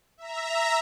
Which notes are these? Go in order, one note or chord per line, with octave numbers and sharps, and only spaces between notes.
E5 A#5